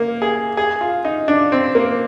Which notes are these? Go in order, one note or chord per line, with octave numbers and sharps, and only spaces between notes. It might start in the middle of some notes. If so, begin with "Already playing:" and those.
Already playing: A#3
G#4
G#4
F4
D#4
D4
C4
A#3